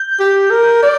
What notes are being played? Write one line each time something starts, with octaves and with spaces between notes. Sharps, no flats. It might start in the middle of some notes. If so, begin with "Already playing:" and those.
Already playing: G6
G4
A#4
D5